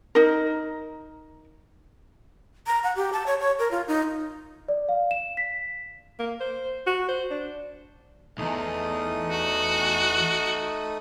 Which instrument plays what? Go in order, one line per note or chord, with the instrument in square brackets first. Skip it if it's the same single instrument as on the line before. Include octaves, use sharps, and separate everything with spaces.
[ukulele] D#4 A#4
[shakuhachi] A#5
F#5
G4
A5
C#5
C#5
A#4
F4
D#4
[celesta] D5
F5
E7
B6
[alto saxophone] A#3
C5
F#4
C5
D4
[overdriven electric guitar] B1 E2 [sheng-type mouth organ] A3 D#4 D#6
[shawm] F#4